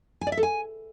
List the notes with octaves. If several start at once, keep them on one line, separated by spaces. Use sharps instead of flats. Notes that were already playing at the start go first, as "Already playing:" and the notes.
G#5
D5
E5
A4
G#5